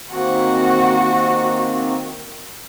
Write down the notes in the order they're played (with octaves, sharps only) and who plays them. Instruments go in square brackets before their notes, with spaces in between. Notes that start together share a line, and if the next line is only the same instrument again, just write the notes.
[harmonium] D#3 A#3 C4 [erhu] F#4